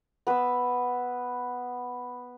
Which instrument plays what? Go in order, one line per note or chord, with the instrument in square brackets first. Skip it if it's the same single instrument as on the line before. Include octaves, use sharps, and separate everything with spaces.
[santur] B3 B4 B5 E6